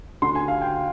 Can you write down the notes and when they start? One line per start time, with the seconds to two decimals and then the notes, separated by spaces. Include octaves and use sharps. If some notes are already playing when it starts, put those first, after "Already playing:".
0.22 D2 D3 C6
0.35 G#5
0.48 F5
0.61 G5